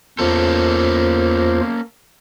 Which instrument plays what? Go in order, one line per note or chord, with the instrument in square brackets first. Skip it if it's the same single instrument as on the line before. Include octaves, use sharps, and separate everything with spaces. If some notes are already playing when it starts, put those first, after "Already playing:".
[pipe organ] E2 F4 C5 [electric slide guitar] A#3 C#4 A4